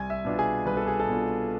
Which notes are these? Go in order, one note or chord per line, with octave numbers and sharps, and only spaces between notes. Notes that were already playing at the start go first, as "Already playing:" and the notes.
Already playing: C2 G#5 G#6
E5 E6
B2 B3 D4 F4
G#4 G#5
C2 B4
A4
G#4
A4
B2 B3 D4 F4